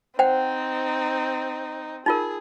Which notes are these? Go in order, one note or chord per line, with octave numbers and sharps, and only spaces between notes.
C4 D#4 C5 F#5 G5
D#4 F4 G#4 A#4